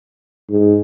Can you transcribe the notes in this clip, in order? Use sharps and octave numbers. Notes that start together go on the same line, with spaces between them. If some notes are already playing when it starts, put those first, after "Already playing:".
G#2